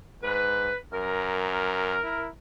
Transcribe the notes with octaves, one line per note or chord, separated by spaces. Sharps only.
G#2 B4
F#2 A#4
E4